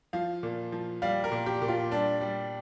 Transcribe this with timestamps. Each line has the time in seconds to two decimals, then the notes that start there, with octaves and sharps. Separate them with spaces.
0.13 F3 F5
0.43 A#2
0.72 F3
1.02 G3 F5
1.24 A#4
1.32 A#2
1.46 G4
1.62 A#2
1.68 F4
1.91 G3 D4
2.21 G3